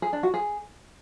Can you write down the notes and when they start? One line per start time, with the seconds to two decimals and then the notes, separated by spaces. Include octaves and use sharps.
0.02 G#4
0.13 D4
0.23 F#4
0.34 G#4